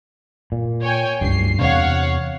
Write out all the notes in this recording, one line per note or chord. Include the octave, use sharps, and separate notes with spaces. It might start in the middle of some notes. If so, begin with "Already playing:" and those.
A#2
C#5 G5 G#5
F#1 C#2 G2 C7
E2 C3 D4 C#5 F5 F#5